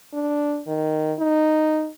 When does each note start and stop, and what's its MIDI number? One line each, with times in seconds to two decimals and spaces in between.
0.13 0.61 62
0.67 1.14 51
1.19 1.89 63